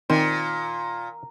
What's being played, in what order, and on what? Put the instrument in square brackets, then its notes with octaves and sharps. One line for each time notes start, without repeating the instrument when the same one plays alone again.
[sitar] A#2 [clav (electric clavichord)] D#3 C4 C5